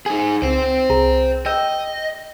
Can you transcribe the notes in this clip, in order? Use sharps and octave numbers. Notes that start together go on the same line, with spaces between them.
D#4 G#4 G#5
C#2 C5 G5
C2 G#4 A#5
D#5 G5 E6 G6